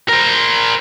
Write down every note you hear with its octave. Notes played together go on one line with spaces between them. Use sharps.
A#4 C5